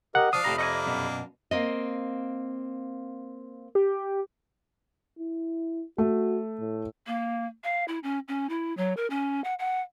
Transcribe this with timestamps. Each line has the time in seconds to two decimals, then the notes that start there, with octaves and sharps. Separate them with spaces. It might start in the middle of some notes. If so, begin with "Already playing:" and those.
0.15 G4 A#4 D#5 F#5
0.33 F3 D4 F5 D#6
0.44 F2 A2 C3 G4 A#5 B5
0.58 A#3 D4 D#5 F#5 G#5
0.87 F#2 B2
1.51 A#3 C4 D#5
3.75 G4
5.19 E4
5.98 A3 F#4
6.60 A2
7.07 A#3
7.64 F5
7.88 E4
8.03 C#4
8.28 C#4
8.49 E4
8.77 F#3
8.97 A#4
9.10 C#4
9.44 F#5
9.59 F#5